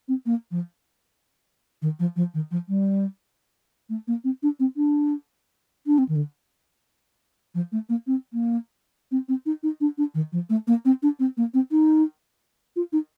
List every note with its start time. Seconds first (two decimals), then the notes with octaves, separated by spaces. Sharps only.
0.08 C4
0.26 A#3
0.51 F3
1.82 D#3
1.99 F3
2.16 F3
2.34 D#3
2.51 F3
2.69 G3
3.89 A3
4.08 A#3
4.24 C4
4.43 D4
4.60 C4
4.77 D4
5.87 D4
5.98 C4
6.09 D#3
6.16 D3
7.55 F3
7.72 A3
7.89 A#3
8.07 C4
8.33 A#3
9.11 C4
9.28 C4
9.46 D#4
9.63 D#4
9.81 D4
9.98 D4
10.15 D#3
10.32 F3
10.50 A3
10.67 A#3
10.85 C4
11.03 D4
11.19 C4
11.37 A#3
11.54 C4
11.71 D#4
12.76 F4
12.93 D#4